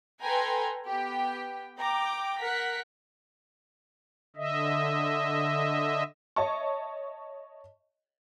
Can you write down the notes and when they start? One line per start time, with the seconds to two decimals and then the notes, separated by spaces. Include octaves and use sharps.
0.23 A4 B4 G5 G#5 A#5 C6
0.87 B3 G4 G5
1.78 G5 A#5 D6
2.41 A#4 F#5 B6
4.36 D3 D#5 E5
6.36 C#5 D#5 E5 A5 C#6